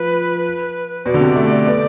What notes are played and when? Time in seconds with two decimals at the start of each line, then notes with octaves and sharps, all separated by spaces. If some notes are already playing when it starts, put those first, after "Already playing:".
Already playing: F3 B4
1.06 B2 D5
1.14 D3
1.20 C3
1.35 A3
1.67 B3